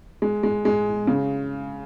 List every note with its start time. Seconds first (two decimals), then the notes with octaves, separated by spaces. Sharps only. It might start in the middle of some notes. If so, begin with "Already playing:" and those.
0.22 G#3
0.43 G#3
0.65 G#3
1.07 C#3